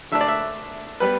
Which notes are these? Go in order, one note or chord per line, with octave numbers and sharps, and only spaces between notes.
D3 A3 D4 E5
D5
E5
G3 B3 B4